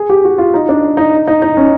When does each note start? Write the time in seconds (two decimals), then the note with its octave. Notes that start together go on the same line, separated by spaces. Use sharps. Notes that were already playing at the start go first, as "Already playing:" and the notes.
Already playing: G#4
0.09 G4
0.24 F#4
0.38 F4
0.54 D#4
0.69 D4
0.97 D#4
1.27 D#4
1.42 D#4
1.57 C#4